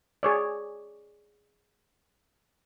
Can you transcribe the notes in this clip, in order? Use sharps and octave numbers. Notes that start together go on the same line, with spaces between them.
G#4 C#5 D5